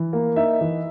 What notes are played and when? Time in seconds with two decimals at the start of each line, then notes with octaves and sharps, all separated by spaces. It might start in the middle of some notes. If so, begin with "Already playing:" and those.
Already playing: E3
0.13 A#3
0.36 D#4 E5
0.61 E3